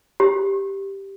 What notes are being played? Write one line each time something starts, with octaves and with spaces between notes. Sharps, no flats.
G4